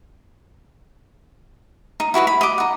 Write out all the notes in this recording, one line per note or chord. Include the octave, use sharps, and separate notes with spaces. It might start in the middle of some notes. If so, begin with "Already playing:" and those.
D#4
E4 F#4 B4 D#5
B5
D#5 D6
D#4 F#5